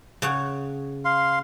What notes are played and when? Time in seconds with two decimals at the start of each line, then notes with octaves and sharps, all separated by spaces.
0.22 C#3 C#5 F#5
1.05 F5 C6